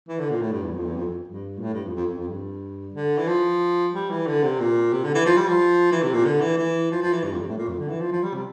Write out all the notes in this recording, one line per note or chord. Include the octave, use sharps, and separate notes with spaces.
E3
D3
A#2
A2
G2
E2
F2
E2
F2
F2
G2
A#2
A2
G2
F2
F2
F2
F2
G2
D3
E3
F3
G3
E3
D3
C3
A#2
C3
D3
E3
F3
G3
F3
E3
C3
A#2
D3
E3
E3
F3
F3
E3
G2
F2
G2
A2
A#2
F2
D3
E3
F3
F3
G3
C3